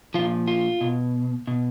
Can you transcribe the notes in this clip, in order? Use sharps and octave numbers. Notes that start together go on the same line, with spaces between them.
A#2 F3 F4
F4
B2
B2